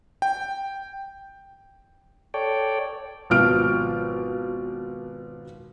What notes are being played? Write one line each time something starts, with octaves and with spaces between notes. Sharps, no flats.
G5
A4 C#5 D5 G5
G#1 B2 F3 F6 D7